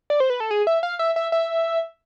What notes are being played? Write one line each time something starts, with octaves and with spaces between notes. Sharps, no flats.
D5
C5
B4
A4
G#4
E5
F5
E5
E5
E5